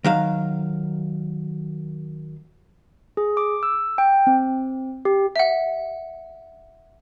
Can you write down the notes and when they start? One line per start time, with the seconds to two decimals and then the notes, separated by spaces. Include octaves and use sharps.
0.04 D#3 F#3 F5
3.17 G#4
3.37 D6
3.63 E6
3.98 G5
4.27 C4
5.05 G4
5.36 E5 F#5